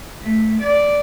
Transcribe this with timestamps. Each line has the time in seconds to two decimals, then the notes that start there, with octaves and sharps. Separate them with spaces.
0.21 A3
0.60 D5